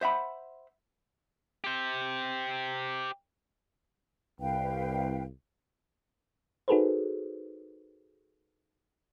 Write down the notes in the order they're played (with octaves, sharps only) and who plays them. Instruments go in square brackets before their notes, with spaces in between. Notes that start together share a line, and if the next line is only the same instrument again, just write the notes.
[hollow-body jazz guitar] C5 E5 F#5 B5
[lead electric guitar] G4 C5
[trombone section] C2 [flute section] B4 F5 G5
[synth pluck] D#4 F#4 G#4 A4 B4 C5